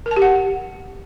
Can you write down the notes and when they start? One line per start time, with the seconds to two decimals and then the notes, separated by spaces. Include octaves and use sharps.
0.06 A#4
0.11 A5
0.16 G4
0.22 F#5